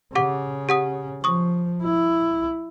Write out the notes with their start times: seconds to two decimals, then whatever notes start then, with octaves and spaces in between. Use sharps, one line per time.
0.15 C#3 G4 F#5 D6
0.69 G4 F#5 D#6
1.24 F3 C#6 D#6
1.83 E4